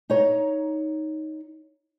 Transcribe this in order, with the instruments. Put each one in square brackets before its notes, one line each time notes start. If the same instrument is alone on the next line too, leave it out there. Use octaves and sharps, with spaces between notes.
[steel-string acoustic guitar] D#4 C#5 A#5